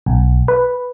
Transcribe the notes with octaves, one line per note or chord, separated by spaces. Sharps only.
B1
B4